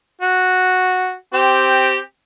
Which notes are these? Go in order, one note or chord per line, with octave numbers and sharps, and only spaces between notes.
F#4
C4 G4